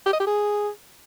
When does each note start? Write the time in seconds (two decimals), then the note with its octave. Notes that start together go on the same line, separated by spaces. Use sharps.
0.06 G4
0.13 D#5
0.20 G4
0.27 G#4